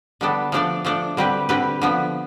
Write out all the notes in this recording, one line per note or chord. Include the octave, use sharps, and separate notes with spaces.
D3 G3 B3 D4 A4
F3 A3 D4 A4 D5
F3 A3 D4 A4 D5
D3 G3 C4 G4 B4
D3 G3 C4 G4 B4
D3 F3 B3